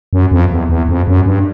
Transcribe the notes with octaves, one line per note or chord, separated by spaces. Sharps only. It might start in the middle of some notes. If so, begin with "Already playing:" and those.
F#2
F2
E2
E2
F2
F#2
G2